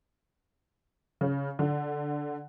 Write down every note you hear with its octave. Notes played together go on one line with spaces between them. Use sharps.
C#3
D3